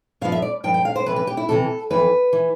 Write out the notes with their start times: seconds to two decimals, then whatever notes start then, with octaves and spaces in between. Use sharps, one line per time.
0.21 G2 F5
0.25 F3
0.32 E5
0.42 D5
0.64 G2 F3 G5
0.74 G5
0.85 F5
0.96 C5
1.06 F2 C3 E3 B4
1.16 B4
1.27 G4
1.37 E4
1.48 F2 C3 E3 A4
1.90 F2 E3 B4
2.33 E3